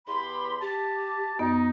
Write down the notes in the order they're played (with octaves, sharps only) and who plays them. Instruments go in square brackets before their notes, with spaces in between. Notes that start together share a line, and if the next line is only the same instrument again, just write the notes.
[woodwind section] E2 G4 B5 [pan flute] C6
[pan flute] G4 [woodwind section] A5
[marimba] F#2 B3 [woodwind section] D#4